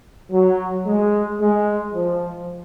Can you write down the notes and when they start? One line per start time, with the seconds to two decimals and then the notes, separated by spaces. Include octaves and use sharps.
0.31 F#3
0.86 G#3
1.39 G#3
1.94 F3